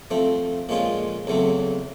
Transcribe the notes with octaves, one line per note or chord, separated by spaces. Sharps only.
F3 A3 C4
A#2 F3 G#3 C#4 F4
E2 C#3 F#3 A3 C4